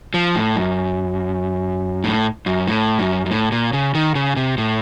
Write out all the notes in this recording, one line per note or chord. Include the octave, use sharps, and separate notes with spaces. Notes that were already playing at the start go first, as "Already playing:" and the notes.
F3
A2
F#2
A2
F#2
A2
F#2
F#2
A2
A#2
C#3
D#3
C#3
C3
A2